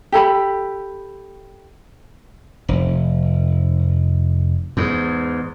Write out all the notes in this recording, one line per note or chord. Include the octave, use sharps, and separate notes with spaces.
G4 A4 A#5 B5
F1
E2 G#2